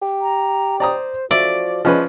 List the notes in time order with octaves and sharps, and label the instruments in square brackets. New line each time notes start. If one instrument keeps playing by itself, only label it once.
[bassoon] G4
[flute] A#5
[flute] C5 [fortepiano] D5 A#5 D#6
[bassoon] F3 [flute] F#4 [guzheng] D5 [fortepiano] E5
[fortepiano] F3 C#4 B4 [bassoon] G#3